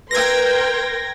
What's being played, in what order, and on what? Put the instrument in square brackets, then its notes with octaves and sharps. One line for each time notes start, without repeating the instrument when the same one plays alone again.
[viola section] A#4 G5 C6 [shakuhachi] B4 [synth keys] G#6 A#6